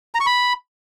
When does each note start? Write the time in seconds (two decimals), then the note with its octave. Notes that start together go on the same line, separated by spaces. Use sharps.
0.15 A#5
0.20 C#6
0.26 B5